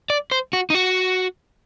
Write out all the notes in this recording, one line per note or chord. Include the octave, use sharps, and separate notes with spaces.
D5
C5
F#4
D#4
F#4